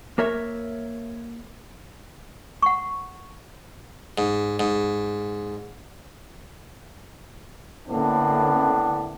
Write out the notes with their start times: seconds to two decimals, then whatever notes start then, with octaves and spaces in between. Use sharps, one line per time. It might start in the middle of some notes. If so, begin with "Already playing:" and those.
0.18 A#3 A#4 C#5 E5
2.62 F#5 C#6
4.18 G#2
4.60 G#2
7.89 A2 D3 A#3 B3 C#4 D4